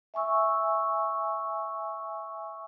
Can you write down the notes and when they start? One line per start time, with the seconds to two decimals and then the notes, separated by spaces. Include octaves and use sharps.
0.14 E5 G#5 C#6 E6